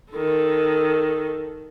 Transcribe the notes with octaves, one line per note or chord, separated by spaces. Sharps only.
D#3 A4